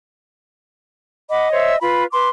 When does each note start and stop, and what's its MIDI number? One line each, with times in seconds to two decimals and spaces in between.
1.30 1.79 75
1.30 1.49 78
1.30 1.49 83
1.30 1.49 86
1.51 1.75 72
1.51 1.75 73
1.51 1.75 76
1.81 2.05 65
1.81 2.05 71
1.81 2.04 83
2.12 2.27 71
2.12 2.30 84
2.12 2.27 86